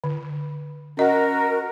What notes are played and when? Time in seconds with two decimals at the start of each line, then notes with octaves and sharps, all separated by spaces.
0.04 D3
0.97 C#4 F#4 A#4 D#5 F#5